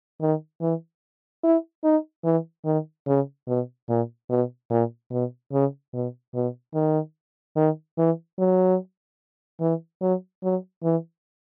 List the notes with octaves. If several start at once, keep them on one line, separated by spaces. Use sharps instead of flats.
D#3
E3
E4
D#4
E3
D#3
C#3
B2
A#2
B2
A#2
B2
C#3
B2
B2
D#3
D#3
E3
F#3
E3
F#3
F#3
E3